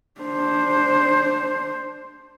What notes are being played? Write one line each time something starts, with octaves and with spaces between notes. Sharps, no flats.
D4 C5